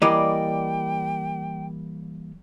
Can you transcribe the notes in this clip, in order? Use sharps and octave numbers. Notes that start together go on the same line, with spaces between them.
E3 G3 A#3 D5 D#5 G5